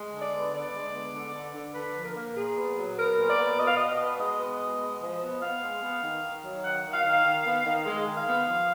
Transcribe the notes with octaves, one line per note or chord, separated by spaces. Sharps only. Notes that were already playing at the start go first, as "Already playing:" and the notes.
Already playing: G#3
D3
D5
B3
D3 D5
G#3
B3
D3
D3
D3
D3 B4
F3
A#4
A#3
A#2 G#4
B3
F#3
B3 A#4
A#2
D5
B3
B2 D#5
F5
B2 D#5
B3
G#3 D#5
B3
B2
G#3
F3
B3
B3 F5
G#3
B3
D#3
D#3
F#3
D#3 F#5
D#3
F5
D#3
D#3
B3
D#3
G#3
D#3
F5
B3
F3